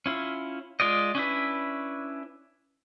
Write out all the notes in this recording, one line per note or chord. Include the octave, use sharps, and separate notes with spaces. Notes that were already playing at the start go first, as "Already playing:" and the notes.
C#4 E4 F4
G#3 F4 D5 D#5
C#4 D4 E4 B4